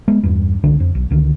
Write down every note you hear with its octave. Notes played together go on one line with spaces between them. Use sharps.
G#3 B3
E2 G2
C2 D3 D4
F2
B1
C#2 D3 D#3